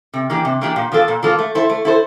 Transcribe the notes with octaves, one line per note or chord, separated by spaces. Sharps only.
C3
E3 A#3 D4 G4
C3
E3 A#3 D4 G4
A#2
F3 A#3 F4 A4
A#2
F3 A#3 F4 A4
A3
E4 A4 C5
A3
E4 A4 C5